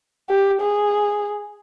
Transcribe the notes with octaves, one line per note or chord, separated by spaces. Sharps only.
G4
G#4